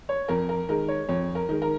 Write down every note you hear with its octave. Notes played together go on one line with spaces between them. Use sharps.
C#5
F2 A#4
A#4
D#3 G#3 A#4
C#5
F2 C#5
A#4
D#3 G#3
A#4